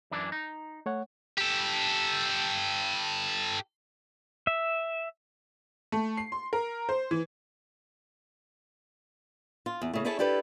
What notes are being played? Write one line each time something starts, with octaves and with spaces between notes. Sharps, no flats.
F#2 E3 D4
D#4
A3 C#5 F#5
G4 A4
E5
A3
C7
C6
A#4
C5
E3
F4
E2
C#3 A3
C#4 E4 G#4 A4 C#5 A5
D4 E4 G4 A4 B4